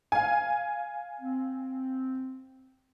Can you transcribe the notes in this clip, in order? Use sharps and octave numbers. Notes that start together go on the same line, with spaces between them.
F5 G#5
C4